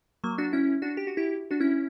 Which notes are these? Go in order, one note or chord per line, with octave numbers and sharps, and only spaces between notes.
F#3 A#3
D4 F#4
C#4 E4
D4 F#4
G4
F#4
E4 G4
D4 F#4
C#4 E4